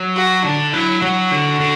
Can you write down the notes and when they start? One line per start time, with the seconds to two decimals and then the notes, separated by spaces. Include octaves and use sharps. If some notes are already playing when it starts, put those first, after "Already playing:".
Already playing: F#3
0.16 F#4
0.44 D3 D4
0.73 F#3 E4
1.02 F#3 F#4
1.31 D3
1.60 D3